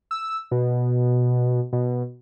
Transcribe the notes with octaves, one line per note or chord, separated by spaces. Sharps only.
E6
B2
B2